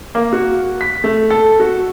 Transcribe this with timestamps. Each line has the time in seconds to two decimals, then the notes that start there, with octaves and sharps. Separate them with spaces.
0.15 A#3
0.33 F#4
0.81 B6
1.04 A3
1.30 A4
1.60 F#4